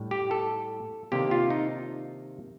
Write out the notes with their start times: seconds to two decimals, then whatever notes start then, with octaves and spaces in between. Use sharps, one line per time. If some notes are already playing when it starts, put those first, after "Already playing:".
Already playing: A2 G3 D4
0.11 G4
0.31 A4
1.12 C3 D#3 A#3 D4 G4
1.31 F4
1.50 D#4